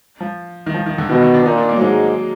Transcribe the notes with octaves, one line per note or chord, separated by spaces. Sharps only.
F3
D#3
F3
D#3
D3
B2 D#3
D#3
D4
A#2 D#4
D4
A#3
F#3
G#2 G#3